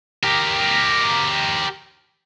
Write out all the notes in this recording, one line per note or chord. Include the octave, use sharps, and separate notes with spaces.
G4 A#4